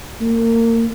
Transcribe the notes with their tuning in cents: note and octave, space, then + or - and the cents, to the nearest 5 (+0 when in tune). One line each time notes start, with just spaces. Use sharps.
A#3 -30